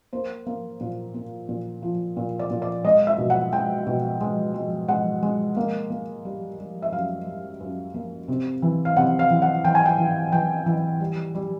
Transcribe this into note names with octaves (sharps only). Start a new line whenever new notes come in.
A#3 C5
A#3
A#2
A#3
A#2
F3
A#2
D5
A#2
D5
G#3 D#5
E5
B2
F#5
G#3 G5
B2
G#3
G#3
G#3 F#5
G#3
A#3
A#3
G3
G3
E5
F#2 F5
G3
F#2
A#3
C3
E3
F5
C3 F#5
F5
E3
F#5
E3 G5
G#5
G5
E3
E3 G5
E3
G3
G3